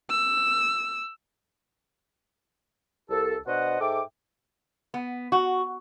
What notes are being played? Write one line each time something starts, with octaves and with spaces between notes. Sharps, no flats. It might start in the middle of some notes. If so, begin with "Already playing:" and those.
E6
C2 A4
B2 D4 C5 D#5 F#5
G#2 A4 E5 G5 D6
B3
F#4